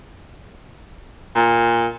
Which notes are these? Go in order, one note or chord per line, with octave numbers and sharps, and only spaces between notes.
A#2